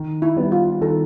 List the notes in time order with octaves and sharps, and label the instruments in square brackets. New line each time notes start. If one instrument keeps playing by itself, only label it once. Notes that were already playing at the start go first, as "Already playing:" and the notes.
Already playing: [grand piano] D#3
[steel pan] E4
[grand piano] G3 B3
[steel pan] F4
[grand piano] D#3 [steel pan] A4